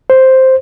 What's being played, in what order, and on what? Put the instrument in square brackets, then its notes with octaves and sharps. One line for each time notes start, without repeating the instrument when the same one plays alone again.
[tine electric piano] C5